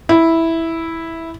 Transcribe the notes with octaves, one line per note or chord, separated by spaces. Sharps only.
E4